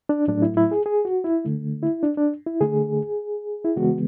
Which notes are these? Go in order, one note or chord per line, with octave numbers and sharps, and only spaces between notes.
D4
A2 F#3 A3 D4
E4
E4
G#4
G#4
F#4
E4
D3 A3
E4
D4
D4
E4
D3 A3 G#4
E4
C#3 E3 G#3 B3 F#4